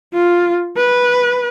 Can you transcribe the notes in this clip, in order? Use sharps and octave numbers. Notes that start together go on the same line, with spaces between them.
F4
B4